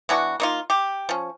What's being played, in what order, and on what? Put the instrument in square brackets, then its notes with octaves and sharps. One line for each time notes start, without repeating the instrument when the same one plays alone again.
[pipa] E3 B3 D4 F#4
A#3 D#4 F4
G4
F3 C#4